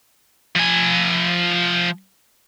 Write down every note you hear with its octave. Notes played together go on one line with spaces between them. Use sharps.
F3 G#5